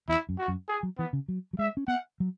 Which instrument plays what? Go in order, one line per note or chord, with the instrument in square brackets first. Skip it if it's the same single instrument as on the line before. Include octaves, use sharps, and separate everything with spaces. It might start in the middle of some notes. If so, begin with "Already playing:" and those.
[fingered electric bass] E2 [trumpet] E4
[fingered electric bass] F#2
[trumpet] F#4
[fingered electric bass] F#2
[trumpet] G#4
[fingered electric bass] F#3
[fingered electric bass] E3 [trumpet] B3
[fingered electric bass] C#3
F#3
F#3
[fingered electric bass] G#3 [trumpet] E5
[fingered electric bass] C#4
[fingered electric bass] B3 [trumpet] F#5
[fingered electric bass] F#3